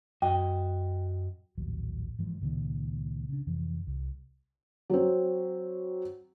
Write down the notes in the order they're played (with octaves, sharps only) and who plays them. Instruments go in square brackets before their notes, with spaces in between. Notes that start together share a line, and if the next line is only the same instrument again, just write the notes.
[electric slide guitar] F#2 F#4 D#5 [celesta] G5
[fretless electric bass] A#1 D#2 A2 F#3
G#2 E3 F3
C#2 A#2 D#3
C#3 D4
F2 C3 E3
C2
[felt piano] F#3 C4